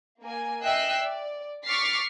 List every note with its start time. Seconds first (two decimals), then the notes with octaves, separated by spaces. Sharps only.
0.22 A#3 G#5
0.63 D#5 E5 G5 E6 F#6 C7
1.03 D5
1.66 C#6 D6 F6 A6 B6 C7